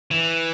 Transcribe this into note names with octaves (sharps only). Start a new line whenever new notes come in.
E3